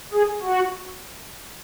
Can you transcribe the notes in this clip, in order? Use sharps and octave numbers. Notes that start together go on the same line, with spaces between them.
G#4
F#4